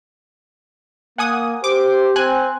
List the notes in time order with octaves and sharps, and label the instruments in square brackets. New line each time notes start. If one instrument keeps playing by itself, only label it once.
[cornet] A#3 [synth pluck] F#5 G#5 D#6
[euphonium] G4 [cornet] C5 [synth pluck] D6
[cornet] C4 [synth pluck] G#5 F#6